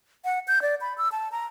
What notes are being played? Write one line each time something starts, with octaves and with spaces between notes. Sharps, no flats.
F#5
G6
D5
B5
E6
A5
A#5